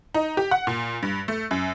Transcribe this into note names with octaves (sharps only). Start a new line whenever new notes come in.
D#4
G4
F#5
A#2
G2
A3
F#2